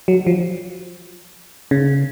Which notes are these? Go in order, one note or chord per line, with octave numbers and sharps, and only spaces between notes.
F#3
F3
C#3